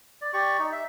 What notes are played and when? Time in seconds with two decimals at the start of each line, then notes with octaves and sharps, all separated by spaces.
0.21 D5
0.33 G4 D5 C#6
0.59 D#4
0.72 E5